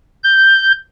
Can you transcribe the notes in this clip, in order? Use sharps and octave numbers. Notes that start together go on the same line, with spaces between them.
G6